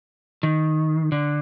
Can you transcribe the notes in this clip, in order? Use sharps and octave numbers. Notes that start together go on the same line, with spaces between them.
D#3
D3